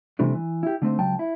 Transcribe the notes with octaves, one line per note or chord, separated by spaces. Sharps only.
C3 E3 G3 A3 D4
E3
E4 G4
D3 A3 C4 D#4
C#2 F#3 G5 A5
E4